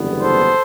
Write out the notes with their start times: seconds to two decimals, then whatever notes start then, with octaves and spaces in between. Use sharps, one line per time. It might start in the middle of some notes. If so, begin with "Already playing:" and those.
Already playing: F#1 E2 D3 G3 B3
0.21 A4 C5